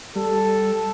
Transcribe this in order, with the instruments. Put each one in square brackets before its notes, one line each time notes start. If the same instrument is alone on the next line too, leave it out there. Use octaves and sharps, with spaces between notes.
[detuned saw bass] G3 [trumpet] A4